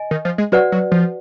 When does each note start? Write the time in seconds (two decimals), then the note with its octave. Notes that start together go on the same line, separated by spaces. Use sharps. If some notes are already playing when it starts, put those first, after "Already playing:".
Already playing: D#5 G#5
0.11 D#3
0.25 F3
0.38 G#3
0.52 F#3 F#4 B4 D5 F#5
0.72 F#3
0.92 F3